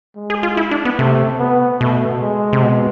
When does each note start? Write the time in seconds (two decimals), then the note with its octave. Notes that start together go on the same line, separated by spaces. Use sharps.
0.16 G#3
0.30 G#4
0.43 F4
0.57 E4
0.71 D4
0.85 B3
0.98 C3 A3
1.39 B3
1.81 B2 A3
2.21 G#3
2.53 C3
2.62 B2